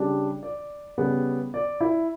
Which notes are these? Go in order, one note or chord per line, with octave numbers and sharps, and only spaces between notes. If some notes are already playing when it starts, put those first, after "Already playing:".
Already playing: C#3 G3 D4
D5
C#3 G3 B3
D5
E4